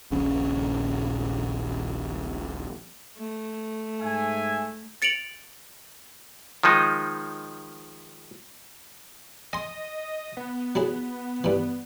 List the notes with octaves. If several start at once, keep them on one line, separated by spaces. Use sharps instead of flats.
D#1 A#1 C#3 C#4
A3
G#2 E5 G#5
A6 C#7 D7 F7 F#7
D#3 F3 G#3 D#4
D#5 G#5 C6
B3
F#3 E4 G#4
G2 E3